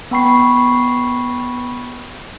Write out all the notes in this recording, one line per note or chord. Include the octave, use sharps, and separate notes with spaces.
B3 G5 B5 C#6 C7